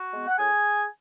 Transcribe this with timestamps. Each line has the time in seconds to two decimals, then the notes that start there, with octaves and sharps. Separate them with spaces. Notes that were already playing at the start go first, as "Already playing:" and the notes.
Already playing: F#4
0.13 G#3 B3
0.27 F#5
0.38 A2 G#4 G#5